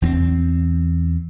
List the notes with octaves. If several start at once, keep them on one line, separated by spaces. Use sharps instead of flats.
E2 B3 C4